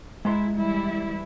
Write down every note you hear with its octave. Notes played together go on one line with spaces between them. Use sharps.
G#3 E4 A#5 C6
E3 G3 E4